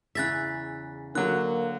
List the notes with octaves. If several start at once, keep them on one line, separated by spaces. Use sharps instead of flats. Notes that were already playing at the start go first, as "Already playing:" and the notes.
E2 C#3 E5 F#6 A6 B6
D3 F#3 A#3 F#4 F#6